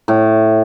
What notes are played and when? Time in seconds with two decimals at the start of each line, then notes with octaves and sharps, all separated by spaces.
0.08 A2